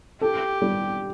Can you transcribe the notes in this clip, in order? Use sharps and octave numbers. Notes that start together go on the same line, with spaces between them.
G4 A4
G3